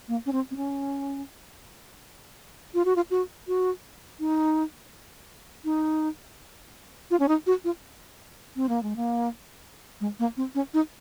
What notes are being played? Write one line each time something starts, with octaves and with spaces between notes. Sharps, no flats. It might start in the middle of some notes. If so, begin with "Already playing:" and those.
A#3
C#4
C4
C4
C#4
F4
F#4
F4
F#4
F#4
D#4
D#4
F4
C#4
D#4
F#4
F4
C4
A#3
G#3
A#3
G#3
A#3
C4
C#4
D#4